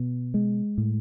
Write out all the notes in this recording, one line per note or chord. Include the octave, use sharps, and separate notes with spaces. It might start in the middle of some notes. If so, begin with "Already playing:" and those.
Already playing: B2
G#3
A2